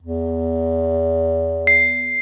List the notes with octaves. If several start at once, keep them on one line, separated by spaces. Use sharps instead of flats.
E2
C7